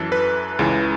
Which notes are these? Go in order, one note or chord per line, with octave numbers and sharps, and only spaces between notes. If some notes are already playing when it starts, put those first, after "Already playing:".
Already playing: F#2 E3 A4
B4
C#2 C#3 E3